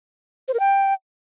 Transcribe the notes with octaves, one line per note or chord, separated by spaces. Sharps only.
C5
A#4
G5